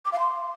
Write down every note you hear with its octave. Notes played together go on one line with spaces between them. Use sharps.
D6
F5
C6